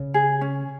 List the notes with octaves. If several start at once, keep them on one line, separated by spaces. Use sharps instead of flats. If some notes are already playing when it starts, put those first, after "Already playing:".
Already playing: C#3
G#4
C#4